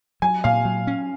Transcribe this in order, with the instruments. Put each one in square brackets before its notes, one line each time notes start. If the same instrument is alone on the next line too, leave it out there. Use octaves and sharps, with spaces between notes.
[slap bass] F#3 [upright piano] G#5
[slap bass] A#2 [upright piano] F5
[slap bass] F#3
C#4